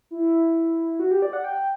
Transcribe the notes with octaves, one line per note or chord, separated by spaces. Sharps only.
E4
F#4
G4
D5
F#5
G5